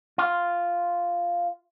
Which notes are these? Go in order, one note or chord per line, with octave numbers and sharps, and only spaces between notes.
F4